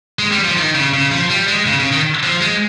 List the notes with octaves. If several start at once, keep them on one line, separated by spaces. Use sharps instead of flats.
G#3
G3
F3
D#3
C#3
C#3
F3
G3
G#3
C#3
C#3
D#3
F3
G#3